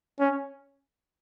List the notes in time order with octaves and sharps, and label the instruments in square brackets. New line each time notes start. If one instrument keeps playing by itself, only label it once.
[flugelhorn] C#4